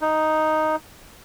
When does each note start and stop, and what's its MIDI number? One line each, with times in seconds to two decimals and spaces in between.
0.01 0.76 63